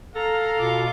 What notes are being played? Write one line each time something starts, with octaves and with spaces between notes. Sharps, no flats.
A4 F5 A#5
B2 F4 D6